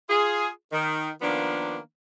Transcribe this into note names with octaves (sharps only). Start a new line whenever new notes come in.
F4 G#4
D#3
D#3 F3 A#3 B3 D4